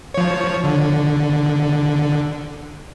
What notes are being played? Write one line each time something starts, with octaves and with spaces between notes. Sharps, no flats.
F3 C#5
D3